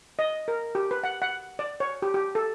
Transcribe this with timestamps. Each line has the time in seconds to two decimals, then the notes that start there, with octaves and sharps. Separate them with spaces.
0.19 D#5
0.48 A#4
0.75 G4
0.91 B4
1.04 F#5
1.22 F#5
1.59 D5
1.80 C#5
2.02 G4
2.14 G4
2.35 A4